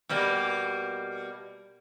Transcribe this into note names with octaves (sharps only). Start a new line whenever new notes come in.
B2 G3 A#3